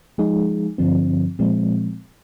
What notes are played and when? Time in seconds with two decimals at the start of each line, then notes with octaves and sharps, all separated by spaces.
0.18 F3 G#3 D#4 G#4
0.78 G2 D3 F3 C4
1.39 A#2 F3 G#3 C4